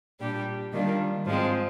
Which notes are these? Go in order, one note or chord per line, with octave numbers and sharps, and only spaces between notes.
A#2 G3 D4 G4
D#3 G3 A#3 D4 F4
G#2 F3 G#3 C4